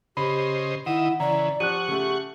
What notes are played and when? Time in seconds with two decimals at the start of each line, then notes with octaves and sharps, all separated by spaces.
0.17 C#3 G4 C5 D#5 B5
0.86 D#3 E4 E5 F#5 D#6
1.20 C#3 E3 D5 A#5
1.60 F3 G4 F#5 C#6 F#6 D#7
1.88 C#3 A3 G4